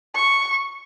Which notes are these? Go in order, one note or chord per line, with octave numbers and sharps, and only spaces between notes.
C#6